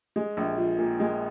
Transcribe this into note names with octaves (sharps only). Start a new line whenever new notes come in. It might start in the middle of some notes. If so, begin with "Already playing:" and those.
G#3
A#1
F3
A#2
G#3